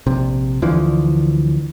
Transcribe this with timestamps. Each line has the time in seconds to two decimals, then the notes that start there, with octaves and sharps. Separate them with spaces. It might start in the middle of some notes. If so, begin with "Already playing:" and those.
0.06 A#1 C3
0.62 D2 D3 E3 F3